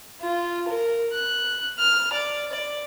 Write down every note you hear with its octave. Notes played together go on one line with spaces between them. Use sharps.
F4
A#4
F#6
F6
D5
D5